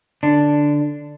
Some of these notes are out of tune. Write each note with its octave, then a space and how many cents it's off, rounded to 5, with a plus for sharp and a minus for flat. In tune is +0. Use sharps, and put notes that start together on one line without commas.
D3 +0 D4 +0